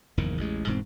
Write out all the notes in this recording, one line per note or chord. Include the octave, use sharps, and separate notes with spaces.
F#1 E2 G#2 D#3
A1 E2 G#3
E1 G#2 G3 C4